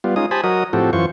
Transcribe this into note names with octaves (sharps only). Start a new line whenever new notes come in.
G3 B3 F4
G#3 C#4 D#4 F4 D#6
G4 C5 G#5 A5 B5 D#6
F#3 F#4 A#4 D#5 D#6
A2 F3 C4 F#4 G4 A4
F#2 E3 F4 C5 C#6